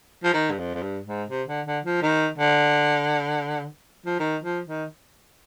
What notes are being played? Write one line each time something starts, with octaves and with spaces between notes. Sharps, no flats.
F3
D#3
G2
F2
F2
G2
G#2
C3
D3
D3
F3
D#3
D3
F3
D#3
F3
D#3